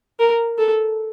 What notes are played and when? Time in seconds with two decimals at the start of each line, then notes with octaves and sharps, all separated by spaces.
0.19 A#4
0.58 A4